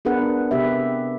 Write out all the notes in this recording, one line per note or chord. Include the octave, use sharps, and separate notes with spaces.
B3 D4 G#4 A#4 B4 F#5
C3 B3 G4 B4 E5